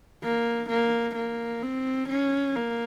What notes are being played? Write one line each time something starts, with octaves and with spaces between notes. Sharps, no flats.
A#3
A#3
A#3
C4
C#4
A#3